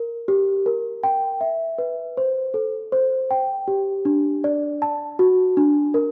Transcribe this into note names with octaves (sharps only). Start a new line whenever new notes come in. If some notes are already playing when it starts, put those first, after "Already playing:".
Already playing: A#4
G4
A#4
G5
E5
B4
C5
A4
C5
G5
G4
D4
D5
A5
F#4
D4
A#4